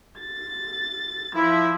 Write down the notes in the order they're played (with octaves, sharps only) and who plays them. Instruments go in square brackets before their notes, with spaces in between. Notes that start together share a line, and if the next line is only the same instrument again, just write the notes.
[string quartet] A6
[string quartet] F3 [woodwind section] E4